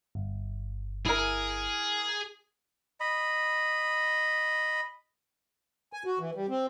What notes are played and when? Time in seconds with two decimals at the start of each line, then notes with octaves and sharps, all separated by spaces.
0.15 G1
1.06 E4 G#4 A#4
3.00 D#5 B5
5.93 G#5
6.05 F#4
6.19 E3
6.35 G3
6.49 C4